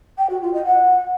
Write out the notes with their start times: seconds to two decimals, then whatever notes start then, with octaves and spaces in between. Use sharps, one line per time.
0.18 G5
0.30 F#4
0.42 F4
0.54 D#5
0.65 F#5